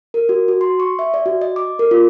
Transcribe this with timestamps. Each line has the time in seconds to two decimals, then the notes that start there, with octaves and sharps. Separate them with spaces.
0.14 A#4
0.29 F#4
0.48 F#4
0.61 C6
0.80 C#6
0.99 E5
1.14 D5
1.26 F#4
1.41 D#5
1.56 D6
1.79 A#4
1.91 F4